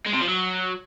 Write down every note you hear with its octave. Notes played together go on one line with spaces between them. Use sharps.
G#3
C3
F3
F#3